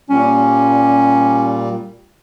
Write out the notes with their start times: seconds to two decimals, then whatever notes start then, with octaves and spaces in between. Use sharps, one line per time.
0.10 A#2 G3 C#4